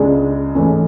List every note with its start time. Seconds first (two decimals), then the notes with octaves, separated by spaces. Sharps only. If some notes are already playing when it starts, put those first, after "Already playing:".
Already playing: C#2 C#3 G#3 D4
0.54 G#2 E3 A3 C#4 E4